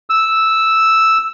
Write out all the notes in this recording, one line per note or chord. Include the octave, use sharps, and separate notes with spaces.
E6